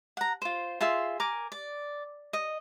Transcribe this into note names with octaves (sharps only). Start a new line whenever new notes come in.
F#5 A#5
F4 C5
F4 G#4 E5 C6
A#4 G#5 D6
D5
D#5